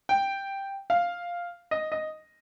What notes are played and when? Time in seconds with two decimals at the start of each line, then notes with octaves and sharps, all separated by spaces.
0.09 G5
0.90 F5
1.71 D#5
1.92 D#5